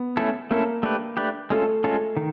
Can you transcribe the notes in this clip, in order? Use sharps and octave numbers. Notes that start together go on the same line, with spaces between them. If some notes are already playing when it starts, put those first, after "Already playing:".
Already playing: B3
A3 C#4 E4 A4
A3 A#3 C#4 E4 A4
A3 D4 G4 B4
A3 D4 G4 B4
G#3 A3 C#4 F4 A4
G#3 C#4 F4 A4
D#3